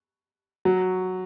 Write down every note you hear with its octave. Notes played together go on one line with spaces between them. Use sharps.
F#3